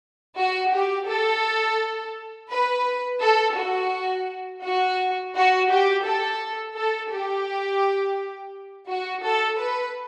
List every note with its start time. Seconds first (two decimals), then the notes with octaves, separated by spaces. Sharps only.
0.38 F#4
0.74 G4
1.09 A4
2.51 B4
3.22 A4
3.57 F#4
4.63 F#4
5.35 F#4
5.70 G4
6.05 A4
6.76 A4
7.12 G4
8.89 F#4
9.25 A4
9.60 B4